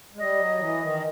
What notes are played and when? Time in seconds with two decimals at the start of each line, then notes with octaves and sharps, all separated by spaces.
0.14 G#3
0.18 G3 D#5
0.40 F#3
0.59 E3
0.81 D#3